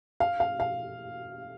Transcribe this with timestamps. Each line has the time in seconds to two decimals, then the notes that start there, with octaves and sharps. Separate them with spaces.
0.20 F5
0.40 F5
0.60 F5